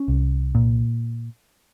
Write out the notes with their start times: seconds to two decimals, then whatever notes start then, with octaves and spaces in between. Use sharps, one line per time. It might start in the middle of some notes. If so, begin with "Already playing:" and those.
Already playing: C#4
0.08 C2
0.55 A#2